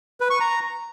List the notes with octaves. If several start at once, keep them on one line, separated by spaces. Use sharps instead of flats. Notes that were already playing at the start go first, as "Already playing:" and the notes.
B4
C#6
A#5